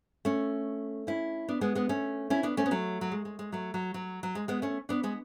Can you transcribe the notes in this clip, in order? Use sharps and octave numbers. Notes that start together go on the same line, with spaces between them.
A3 C#4
C#4 E4
B3 D4
G#3 B3
G#3 B3
A3 C#4
C#4 E4
B3 D4
A3 C#4
B3
F#3 A3
F#3
G#3
G#3
G#3
F#3 A3
F#3
F#3
F#3
G#3
G#3 B3
A3 C#4
B3 D4
G#3 B3